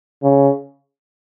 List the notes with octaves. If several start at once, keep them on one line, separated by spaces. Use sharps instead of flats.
C#3